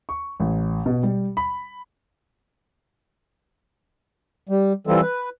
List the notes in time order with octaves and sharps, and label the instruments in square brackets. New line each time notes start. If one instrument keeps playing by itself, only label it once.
[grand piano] C#6
A1
B2
G3
B5
[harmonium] G3
E3 G3 C4 F4 A4
B4